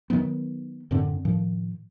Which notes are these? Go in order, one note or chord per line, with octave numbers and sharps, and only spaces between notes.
D#3 F3 F#3 B3
F#2 A2 D3 C4
A2 D#3 F3